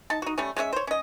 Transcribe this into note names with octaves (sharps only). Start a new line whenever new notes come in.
D#4 A5
D#4 F#4
G3 A3 C#4
G#3 A3 C#4 E5
C5 C#5
C#4 D#5